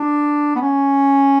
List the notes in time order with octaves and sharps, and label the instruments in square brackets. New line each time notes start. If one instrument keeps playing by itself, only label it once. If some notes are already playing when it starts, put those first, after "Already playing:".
Already playing: [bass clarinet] D4
B3
C#4